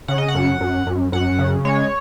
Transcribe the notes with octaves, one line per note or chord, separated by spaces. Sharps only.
C#3 F#5
D#5
F#5
F#2
F#2
F#2
F#2 F#5
C#3
G#3 C#5